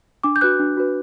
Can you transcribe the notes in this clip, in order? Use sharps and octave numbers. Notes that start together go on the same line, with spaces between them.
D4 D6
G6
F#4 B4 F#6
D4
F#4 B4